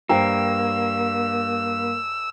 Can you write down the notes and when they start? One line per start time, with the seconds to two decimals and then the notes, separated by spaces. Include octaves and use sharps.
0.09 G2 A#3 C5 G5 A#5 E6